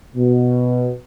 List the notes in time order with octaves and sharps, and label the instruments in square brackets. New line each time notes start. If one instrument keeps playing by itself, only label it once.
[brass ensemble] B2